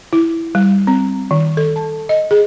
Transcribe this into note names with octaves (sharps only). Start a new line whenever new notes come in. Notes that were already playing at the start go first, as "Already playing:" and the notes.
E4
G3
C4
D#3
A4
A5
D#5
G#4